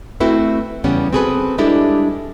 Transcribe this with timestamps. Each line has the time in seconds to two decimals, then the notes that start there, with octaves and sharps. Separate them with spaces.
0.20 A3 C4 E4 F#4 A4 B4
0.84 E2 C#3 G3 B3 C#4
1.13 C4 F#4 G#4 A4 B4
1.58 G3 G#3 D4 E4 G4 A4